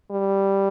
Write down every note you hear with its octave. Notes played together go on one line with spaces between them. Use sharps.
G3